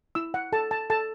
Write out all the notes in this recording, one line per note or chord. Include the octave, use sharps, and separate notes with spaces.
E4 E6
F#5
A4 A5
A5
A4 A5